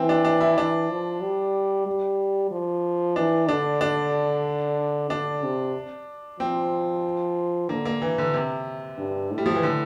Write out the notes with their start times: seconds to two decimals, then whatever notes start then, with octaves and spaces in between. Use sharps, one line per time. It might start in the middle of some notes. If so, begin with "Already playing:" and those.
Already playing: E3 C4
0.09 D4
0.25 D4
0.40 E4
0.57 E3 D4
0.90 F3
1.22 G3
1.86 G3
2.51 F3
3.16 E3 D4
3.48 D3 D4
3.81 D4
5.10 D3 D4
5.43 C3
6.40 F3 C4
7.69 D3 A#3
7.85 A#3
8.02 E3
8.18 D3
8.34 C3
8.98 G2
9.31 A2
9.38 G3
9.46 F3
9.55 E3
9.63 D3